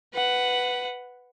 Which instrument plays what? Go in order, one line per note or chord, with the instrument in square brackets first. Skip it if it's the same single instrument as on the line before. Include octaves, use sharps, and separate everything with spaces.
[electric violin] B4 F#5